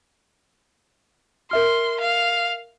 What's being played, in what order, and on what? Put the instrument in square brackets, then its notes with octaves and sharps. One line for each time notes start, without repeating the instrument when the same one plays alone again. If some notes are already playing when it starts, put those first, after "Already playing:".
[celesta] A#4 E5 F6 [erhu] C6
[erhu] F5